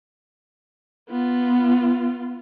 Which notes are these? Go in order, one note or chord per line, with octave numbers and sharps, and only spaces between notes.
B3 F4